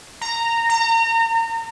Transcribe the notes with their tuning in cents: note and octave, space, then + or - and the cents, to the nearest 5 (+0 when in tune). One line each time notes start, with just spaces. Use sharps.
A#5 -15
A#5 -35